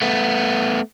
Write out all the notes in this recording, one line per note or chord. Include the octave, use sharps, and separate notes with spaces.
A3 B3